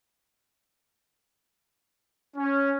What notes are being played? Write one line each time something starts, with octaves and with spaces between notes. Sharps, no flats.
C#4